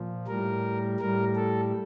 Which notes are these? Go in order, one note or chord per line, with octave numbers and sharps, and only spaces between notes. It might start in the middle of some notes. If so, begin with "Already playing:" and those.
Already playing: A#2 F3
A2 G3 A#4
A2 G3 A#4
A4